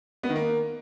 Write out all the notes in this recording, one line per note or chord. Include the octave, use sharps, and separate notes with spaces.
B3
D#3
A#3